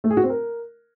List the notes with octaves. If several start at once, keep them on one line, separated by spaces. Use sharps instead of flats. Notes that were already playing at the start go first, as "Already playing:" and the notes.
A3
G#4
F#4
C4
A#4